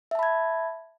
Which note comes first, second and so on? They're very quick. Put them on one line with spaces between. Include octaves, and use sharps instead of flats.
E5 A5 B5 G#6